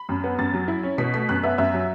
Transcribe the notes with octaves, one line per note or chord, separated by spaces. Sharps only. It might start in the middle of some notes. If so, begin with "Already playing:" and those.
Already playing: B5
F#2
B3
F#2 A6
F#3
E4
C#4
B2 B6
A3 B6
F#2 F#6
B3 E5
F#2 E5
F#3